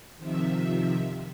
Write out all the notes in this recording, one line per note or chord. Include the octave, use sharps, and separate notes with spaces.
C3 D#3 F3 E5